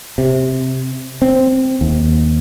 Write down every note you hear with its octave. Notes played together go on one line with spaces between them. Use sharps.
C3
C4
D#2